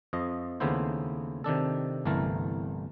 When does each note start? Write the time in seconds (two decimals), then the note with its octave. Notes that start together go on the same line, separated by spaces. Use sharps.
0.13 F2 F3 D#5
0.60 D#2 C#3 A3 B3 E4 C5
1.44 C3 D#3 D4 A4
2.05 G1 C2 E3 A3 A#4 A5